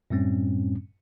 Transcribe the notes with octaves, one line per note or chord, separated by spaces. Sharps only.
F#2 A2 G3 C4 C#4